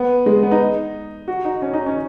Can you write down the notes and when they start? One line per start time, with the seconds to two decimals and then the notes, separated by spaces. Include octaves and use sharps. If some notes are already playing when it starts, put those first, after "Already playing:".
Already playing: B3
0.26 G#3
0.43 B3
0.51 D#4
1.28 F#4
1.45 D#4
1.62 C#4
1.74 D#4
1.86 C#4